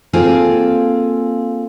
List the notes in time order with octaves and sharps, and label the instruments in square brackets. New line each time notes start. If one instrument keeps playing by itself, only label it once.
[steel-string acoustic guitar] A#3 C4 F4 G#4 A4 G#5